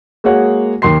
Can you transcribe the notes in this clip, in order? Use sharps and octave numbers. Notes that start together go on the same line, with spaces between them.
G#3 A#3 F#4 G#4 C#5 F#5
D#2 A#4 C6 C7